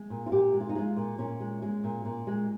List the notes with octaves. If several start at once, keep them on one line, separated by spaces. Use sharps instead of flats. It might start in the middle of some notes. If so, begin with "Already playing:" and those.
Already playing: G#3
A#2
F4
A#2 G4
G#3
F4
D#4
G#3 F4
A#2
A#2 C#4
G#3
G#3
A#2
A#2
G#3